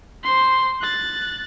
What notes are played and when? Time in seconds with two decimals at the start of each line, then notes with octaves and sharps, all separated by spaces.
0.23 C5 C6
0.81 F#6 A6